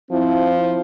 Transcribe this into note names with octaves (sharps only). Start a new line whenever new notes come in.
F3 C4 E4